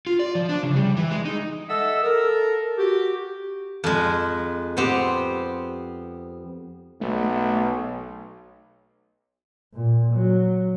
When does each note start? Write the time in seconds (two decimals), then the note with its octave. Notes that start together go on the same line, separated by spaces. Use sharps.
0.07 F4
0.19 D5
0.35 F3
0.49 D4
0.63 C#3
0.76 G3
0.97 E3
1.11 G#3
1.25 D#4
1.69 A4 D#5 E5 F#5 E6
2.03 A4 A#4
2.78 F#4 G4
3.84 F2 G#3
4.77 B3 C4 G4
7.01 B1 A3
9.74 A#2
10.14 F#3